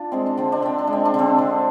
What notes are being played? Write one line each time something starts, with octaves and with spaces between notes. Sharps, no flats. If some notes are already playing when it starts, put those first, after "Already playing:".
Already playing: D4 F4
G#3 C4
D4
D3 C4
D4
D3 C4
D4
G#3
C4
D4
D3 C4
D3